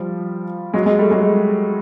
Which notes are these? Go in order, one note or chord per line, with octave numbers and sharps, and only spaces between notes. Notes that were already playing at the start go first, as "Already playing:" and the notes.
Already playing: F3 G3
F#3 G#3
F#3 G#3
G3 A3
F#3 G#3